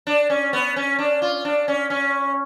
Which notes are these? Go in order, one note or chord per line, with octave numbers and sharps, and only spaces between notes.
D4
C#4
B3
C#4
D4
F4
D4
C#4
C#4